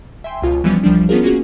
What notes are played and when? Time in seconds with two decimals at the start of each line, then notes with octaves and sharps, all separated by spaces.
0.24 E5 G5 G#5 C6
0.42 C#2 B2 F4 G#5
0.64 E3 F3 G3 B3 C#4
0.83 C2 F3 G3 D4
1.09 B3 C#4 D4 F4 G#4 A#4
1.23 A#3 C#4 F4 F#4 G#4